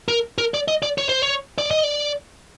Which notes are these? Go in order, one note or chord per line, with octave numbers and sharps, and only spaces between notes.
A#4
A#4
D5
D#5
D5
C#5
C5
C#5
D5
D#5
D5